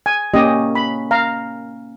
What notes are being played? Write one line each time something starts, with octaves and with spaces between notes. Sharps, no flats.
G#5
A#3 C#4 G4 D#5
B5
F5 A#5